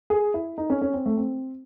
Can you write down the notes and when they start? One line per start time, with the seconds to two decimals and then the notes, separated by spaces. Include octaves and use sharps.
0.10 G#4
0.34 E4
0.58 D#4
0.70 C#4
0.82 C#4
0.94 C4
1.06 A3
1.17 C4